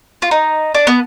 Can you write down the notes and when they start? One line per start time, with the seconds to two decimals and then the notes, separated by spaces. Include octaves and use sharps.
0.22 F4
0.31 D#4
0.74 D4
0.87 B3